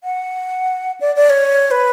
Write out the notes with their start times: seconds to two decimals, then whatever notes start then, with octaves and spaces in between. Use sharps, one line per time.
0.04 F#5
1.01 D5
1.16 D5
1.30 C#5
1.71 B4